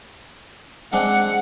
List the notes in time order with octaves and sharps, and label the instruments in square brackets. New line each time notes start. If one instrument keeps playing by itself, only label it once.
[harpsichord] G#3 C4 D4 [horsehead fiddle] F#5